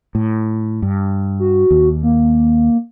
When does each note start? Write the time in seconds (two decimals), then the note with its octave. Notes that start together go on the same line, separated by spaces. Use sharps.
0.15 A2
0.82 G2
1.39 F#4
1.71 D#2
2.03 A#3